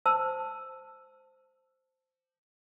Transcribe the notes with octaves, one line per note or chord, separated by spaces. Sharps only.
C5 A5 E6